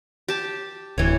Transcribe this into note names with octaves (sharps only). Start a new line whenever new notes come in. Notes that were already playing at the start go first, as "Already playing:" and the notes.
G4 A5
D1 E3 C#5